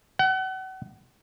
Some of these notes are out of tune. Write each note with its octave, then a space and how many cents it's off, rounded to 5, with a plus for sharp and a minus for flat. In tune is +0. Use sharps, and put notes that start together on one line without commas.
F#5 +35